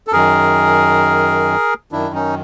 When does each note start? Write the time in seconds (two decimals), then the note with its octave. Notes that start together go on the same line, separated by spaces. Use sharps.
0.07 A4
0.12 F#2 D#3 G#4 A#4
1.92 F#2 D#3 D4 E4
2.15 C#4 D#4